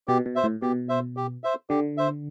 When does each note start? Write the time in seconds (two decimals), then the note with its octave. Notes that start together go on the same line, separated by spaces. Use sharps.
0.08 B2 G4
0.26 B2
0.36 C5 E5
0.44 A2
0.62 B2 G4
0.89 C5 E5
1.17 G4
1.44 C5 E5
1.70 D3 G4
1.97 C5 E5